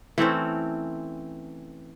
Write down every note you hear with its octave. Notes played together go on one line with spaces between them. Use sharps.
E3 A3 C4 C#4